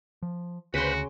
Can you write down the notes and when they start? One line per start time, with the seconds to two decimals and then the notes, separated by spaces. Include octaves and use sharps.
0.22 F3
0.74 D2 C#3 F#4 B4 C5 B5 C6